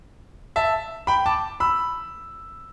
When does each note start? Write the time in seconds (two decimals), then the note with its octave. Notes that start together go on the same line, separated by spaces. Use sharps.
0.56 E5 A5
1.07 G5 B5
1.26 A5 D6
1.60 B5 E6